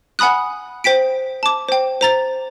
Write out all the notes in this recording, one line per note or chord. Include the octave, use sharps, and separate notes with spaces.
F#5 G#5 B5 D#6 F#6
C5 G5 B6 D7
A5 D6
C5 G5
C5 A#5 A6